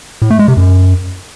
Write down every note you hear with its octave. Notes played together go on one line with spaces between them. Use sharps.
A2
A3
G#3
C3
F#2